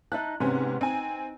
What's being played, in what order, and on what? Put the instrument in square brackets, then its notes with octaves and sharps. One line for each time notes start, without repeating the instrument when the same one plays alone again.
[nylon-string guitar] D#4 E5 A5 [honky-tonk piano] F#6
[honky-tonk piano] G#2 C#4 [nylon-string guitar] C3 B3
[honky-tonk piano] C4 G#5 [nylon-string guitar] D#4